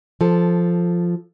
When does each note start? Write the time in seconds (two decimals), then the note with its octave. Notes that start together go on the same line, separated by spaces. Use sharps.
0.21 F3 A4